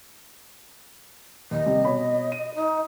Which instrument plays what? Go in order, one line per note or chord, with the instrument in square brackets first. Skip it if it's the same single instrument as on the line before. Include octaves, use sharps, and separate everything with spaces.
[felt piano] D#2 [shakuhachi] D#5
[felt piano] C3 G3
B2 C#5 B5
D#7
[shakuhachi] D#4